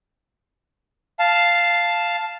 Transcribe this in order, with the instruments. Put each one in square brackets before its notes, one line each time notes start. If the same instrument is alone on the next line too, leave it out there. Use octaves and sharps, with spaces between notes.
[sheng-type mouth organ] F5 A5